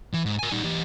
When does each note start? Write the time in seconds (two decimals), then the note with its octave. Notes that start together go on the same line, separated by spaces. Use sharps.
0.13 E3
0.25 G#2
0.39 A#4 G#5
0.51 G3 D#4
0.64 E3 G4